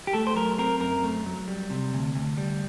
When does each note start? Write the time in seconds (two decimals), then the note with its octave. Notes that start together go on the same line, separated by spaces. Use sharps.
0.07 G4
0.13 A3 A4
0.27 C5
0.35 F#3 A#4
0.58 C4 A#4
0.80 F#2 A#4
1.03 A3
1.26 F#3
1.48 G3
1.70 C3
1.93 D2
2.15 D2
2.37 G3